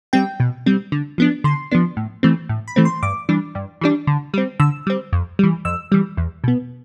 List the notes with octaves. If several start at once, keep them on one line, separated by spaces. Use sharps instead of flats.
G3 C4 G5
B2
G3 C4
D3
F3 B3 D4
D3 C6
F3 B3 D4
A2
E3 A3 C4
A2
B5
E3 A3 C4
C6
G2 D6
E3 G3 D4
G2
E3 G3 D4
D3
G3 C4
D3 E6
G3 C4
F2
E3 G3
F2 E6
E3 G3
E2
B2 B3